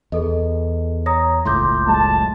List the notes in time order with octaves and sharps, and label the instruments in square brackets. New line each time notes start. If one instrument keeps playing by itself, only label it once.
[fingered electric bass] E2 [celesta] G#4 A4 D#5
[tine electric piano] C#5 [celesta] A#5 D#6 A#6
[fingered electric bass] F#1 C#2 A2 [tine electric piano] A3 G6 [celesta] C6 D6
[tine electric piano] F#3 G#3 A3 [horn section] A5